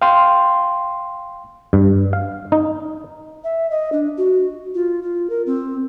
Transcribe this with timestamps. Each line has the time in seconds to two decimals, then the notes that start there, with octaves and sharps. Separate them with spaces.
0.02 F5 G5 C6
1.73 G2
2.13 F5
2.52 D#4
3.44 E5
3.70 D#5
3.92 D4
4.18 F#4
4.74 F4
5.03 F4
5.30 A#4
5.46 C4